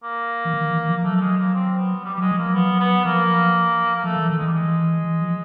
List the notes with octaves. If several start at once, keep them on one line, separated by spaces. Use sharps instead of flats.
A#3
E3
D#3
E3
F3
A#3
F#3 A3
A3
G#3
A#3
C4
B3
G3
G3
F#3 G#3
F3
A#3
F#3
B3
B3
F3 A#3
A#3
F3 A3
E3
D#3 A3
G#3
E3 G3
G#3
E3
F3